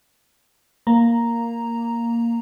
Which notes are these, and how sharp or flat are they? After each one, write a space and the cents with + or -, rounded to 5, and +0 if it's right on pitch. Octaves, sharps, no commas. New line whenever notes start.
A#3 +0 A#5 +0